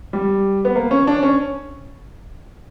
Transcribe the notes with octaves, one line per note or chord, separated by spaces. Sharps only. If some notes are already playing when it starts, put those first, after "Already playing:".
G3
B3
A#3
C#4
D4
C#4